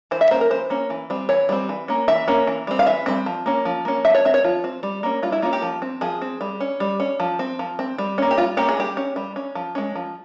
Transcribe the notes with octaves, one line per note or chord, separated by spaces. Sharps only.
E3 C5
E5
A#3 C#4 C5
A#4
E3 C5
A#3 C#4
E3
G3 C4
E3 C#5
G3 C4
E3
A#3 C#4
E3 E5
A#3 C#4
E3
G3 C4
F5
E3 E5
G3 C4
F3
A#3 C#4
F3
A#3 C#4
F3 E5
C#5
C4 E5
C#5
F3 F4
C4
G3
A#3 C#4
G3 F4
E4
A#3 C#4 F4
G4
F3
C4
F3 G#4
C4
G3
C#4
G3
C#4
F3
C4
F3
C4
G3
A#3 C#4
G4
G3 F4
A#3 C#4 G4
G#4
G3 G4
C#4
G3
C#4
F3
G#3 C#4
F3